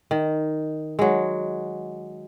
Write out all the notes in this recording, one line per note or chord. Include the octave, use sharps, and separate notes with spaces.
D#3
F#3 G#3